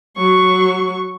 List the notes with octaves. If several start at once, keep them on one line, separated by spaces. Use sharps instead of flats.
F#3 C#6